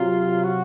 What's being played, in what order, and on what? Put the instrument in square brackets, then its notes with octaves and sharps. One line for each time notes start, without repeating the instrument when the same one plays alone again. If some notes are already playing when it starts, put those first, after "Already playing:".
Already playing: [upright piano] C3 F#3 [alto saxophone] F4
[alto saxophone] F#4